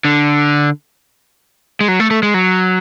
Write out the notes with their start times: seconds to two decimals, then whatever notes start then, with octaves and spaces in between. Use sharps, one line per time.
0.05 D3
1.81 G#3
1.88 F#3
2.00 A3
2.11 A3
2.23 G#3
2.34 F#3